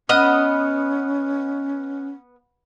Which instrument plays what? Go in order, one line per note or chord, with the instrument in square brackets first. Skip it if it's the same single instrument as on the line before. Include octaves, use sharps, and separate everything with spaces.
[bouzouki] B3 [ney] C#4 [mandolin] D#5 D#6 [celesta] F6 F#6